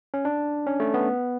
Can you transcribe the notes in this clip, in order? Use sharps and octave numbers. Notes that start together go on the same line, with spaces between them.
C#4
D4
C#4
A3
B3